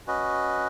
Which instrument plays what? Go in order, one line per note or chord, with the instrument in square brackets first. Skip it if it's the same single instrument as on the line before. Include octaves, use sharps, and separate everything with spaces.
[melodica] C#4 F#4 B4 D#5